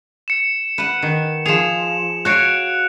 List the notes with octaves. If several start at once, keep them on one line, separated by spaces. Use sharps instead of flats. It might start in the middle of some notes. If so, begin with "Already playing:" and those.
C#7 E7
B4 F#5
D#3
F3 G#4 E7 F7
F#4 C#5 F5 F#6 C#7 D7